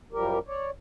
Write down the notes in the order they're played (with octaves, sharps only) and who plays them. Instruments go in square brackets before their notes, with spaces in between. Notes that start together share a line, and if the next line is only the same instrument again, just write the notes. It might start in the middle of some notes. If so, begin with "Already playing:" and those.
[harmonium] F#2 F3 G3 G4 A#4
C#5 D5